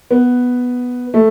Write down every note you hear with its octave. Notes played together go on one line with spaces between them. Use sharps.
B3
A3